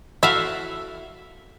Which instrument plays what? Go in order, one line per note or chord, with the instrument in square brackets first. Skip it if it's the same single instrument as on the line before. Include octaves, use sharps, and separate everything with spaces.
[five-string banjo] E4 F#4 A4 [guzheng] E5 F5